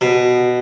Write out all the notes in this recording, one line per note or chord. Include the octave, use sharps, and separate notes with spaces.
B2